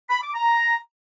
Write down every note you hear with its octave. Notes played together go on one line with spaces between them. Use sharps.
B5
D6
A#5